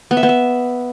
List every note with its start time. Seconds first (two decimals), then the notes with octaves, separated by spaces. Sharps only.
0.11 B3
0.17 E5
0.23 B3
0.29 E5